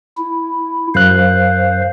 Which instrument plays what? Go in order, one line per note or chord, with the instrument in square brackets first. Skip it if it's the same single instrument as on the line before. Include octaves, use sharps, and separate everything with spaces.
[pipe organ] E4
[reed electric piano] F#2 F#6 [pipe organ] C5 F5